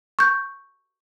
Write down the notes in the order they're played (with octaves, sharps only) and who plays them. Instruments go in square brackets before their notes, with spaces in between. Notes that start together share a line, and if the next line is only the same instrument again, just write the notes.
[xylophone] C#6 G6